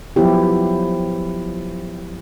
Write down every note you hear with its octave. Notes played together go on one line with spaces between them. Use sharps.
F3 F#3 B3 E4 G4